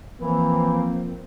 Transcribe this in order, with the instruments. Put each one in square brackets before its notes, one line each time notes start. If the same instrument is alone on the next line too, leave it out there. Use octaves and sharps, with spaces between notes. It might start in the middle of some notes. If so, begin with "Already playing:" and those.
[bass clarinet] E3 [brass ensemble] F3 A#3 [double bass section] C4